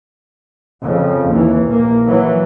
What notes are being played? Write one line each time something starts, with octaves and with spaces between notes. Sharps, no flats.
F2 C#3
D#2 E3
A#1 A#3
E3 F#3